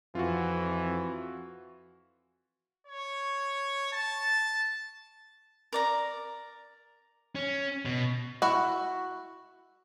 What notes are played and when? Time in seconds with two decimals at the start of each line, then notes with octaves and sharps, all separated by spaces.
0.15 F2 E3 F4 F#4
2.87 C#5
3.93 A5
5.73 A#4 D5 A#5
7.35 C#4
7.85 B2
8.42 E4 F#4 F#5